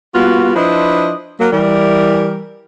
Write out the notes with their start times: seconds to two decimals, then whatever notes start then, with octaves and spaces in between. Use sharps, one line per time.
0.15 G3 A#3 B3 F4 F#4
0.56 F3 D4 E4 B4 C5 D#5
1.40 F#3 A#3
1.53 E3 G3 A#4